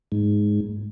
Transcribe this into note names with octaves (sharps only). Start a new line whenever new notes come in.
G#2